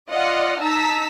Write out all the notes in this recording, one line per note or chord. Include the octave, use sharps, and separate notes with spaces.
F4 D5 D#5 F#5 F6
D#4 A5 A#5 E6 B6